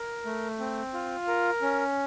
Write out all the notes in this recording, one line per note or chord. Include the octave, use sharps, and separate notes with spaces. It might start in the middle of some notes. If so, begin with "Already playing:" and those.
Already playing: A#4
A3
C4
F4
A#4
C#4